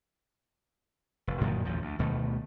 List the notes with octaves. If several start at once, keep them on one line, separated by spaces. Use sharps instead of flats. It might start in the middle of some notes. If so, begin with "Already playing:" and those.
F1
F#2 A#2 D#3 F3
A1 E2 A#2 F3
D2
D2 B2 D#3 A3